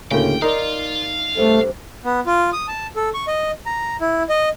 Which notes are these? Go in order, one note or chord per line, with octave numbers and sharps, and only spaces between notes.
D2 A2 C#3 A#3 G5
D#4 A#4 D5 F5 C6
G2 C3 A3
B3
F4
D#6
A5
A4
C#6
D#5
A#5
E4
D#5